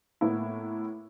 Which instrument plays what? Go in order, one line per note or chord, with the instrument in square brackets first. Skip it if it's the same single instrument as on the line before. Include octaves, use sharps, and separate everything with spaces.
[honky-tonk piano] A2 A#3 B3 E4